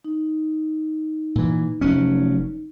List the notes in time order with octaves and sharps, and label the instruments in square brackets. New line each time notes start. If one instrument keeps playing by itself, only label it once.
[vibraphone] D#4
[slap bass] A#2 E3
F1 F#3 C#4